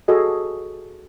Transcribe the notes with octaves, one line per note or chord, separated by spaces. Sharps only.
F#4 G#4 A4 D#5